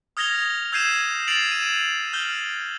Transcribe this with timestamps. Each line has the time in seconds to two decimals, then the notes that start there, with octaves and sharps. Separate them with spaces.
0.17 D#6 F6 G#6 A#6 F7 G7
0.72 E6 G6 G#6 C7 D#7 E7
1.28 A6 C7 D7 F7 F#7
1.52 D#7 E7
2.13 F6 G6 G7